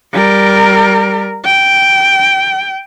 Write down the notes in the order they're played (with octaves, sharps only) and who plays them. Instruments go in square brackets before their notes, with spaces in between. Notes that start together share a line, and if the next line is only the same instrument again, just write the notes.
[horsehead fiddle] G3 A#4
G5